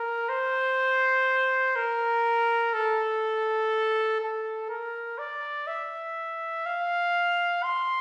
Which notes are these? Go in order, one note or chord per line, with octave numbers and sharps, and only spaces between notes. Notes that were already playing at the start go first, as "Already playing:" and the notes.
Already playing: A#4
C5
A#4
A4
A4
A#4
D5
E5
F5
C6